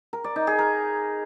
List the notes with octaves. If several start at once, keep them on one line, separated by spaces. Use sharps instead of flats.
A#4
D5
D#4
G#4
A#4